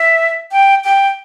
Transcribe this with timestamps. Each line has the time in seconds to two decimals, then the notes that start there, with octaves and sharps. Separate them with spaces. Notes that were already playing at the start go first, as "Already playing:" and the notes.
Already playing: E5
0.52 G5
0.84 G5